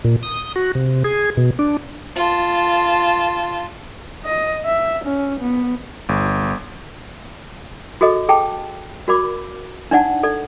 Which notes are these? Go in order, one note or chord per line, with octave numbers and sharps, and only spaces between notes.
A#2
D#6
F#4
C3
G#4
B2
D4
F4 A5
D#5
E5
C#4
B3
G1
F#4 G#4 A4 D#5
G#4 A4 G5 A5
F#4 A#4 D5 B5 D6
D4 D#4 D5 F#5 A5
A4 D5